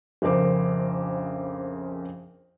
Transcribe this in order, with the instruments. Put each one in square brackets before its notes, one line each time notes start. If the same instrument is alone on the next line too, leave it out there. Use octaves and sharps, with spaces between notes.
[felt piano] A#1 F2 C#3 A#4 C5 D6